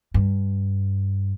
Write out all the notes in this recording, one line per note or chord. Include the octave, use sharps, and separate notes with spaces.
G2